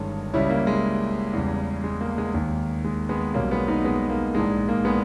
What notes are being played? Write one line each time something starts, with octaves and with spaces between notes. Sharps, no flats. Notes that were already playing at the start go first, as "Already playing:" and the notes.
Already playing: G1 G2 D#3 G#3 C#4
C#2 C#3 G3 C#4 E4
A#3
G#3
E2 C#3 G3
G#3
A#3
G#3
D#2 D#3 G#3
G#3
G#3 B3
B1 B2 G3 A#3 C#4
G#3 B3
B3 D#4
G#3 B3
A#3
A#1 G#2 E3 G#3
A#3
G#3 B3